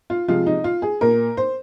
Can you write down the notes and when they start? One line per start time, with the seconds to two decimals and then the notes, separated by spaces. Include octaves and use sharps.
0.10 F4
0.28 C3 F3 G#3 F4
0.46 D#4
0.64 F4
0.82 G#4
1.01 A#2 A#3 A#4
1.37 C5